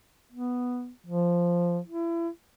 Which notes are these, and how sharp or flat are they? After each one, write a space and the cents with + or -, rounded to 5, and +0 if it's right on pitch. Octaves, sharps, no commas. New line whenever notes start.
B3 +0
F3 -5
E4 +30